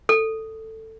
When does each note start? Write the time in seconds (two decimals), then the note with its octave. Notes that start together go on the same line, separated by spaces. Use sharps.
0.09 A4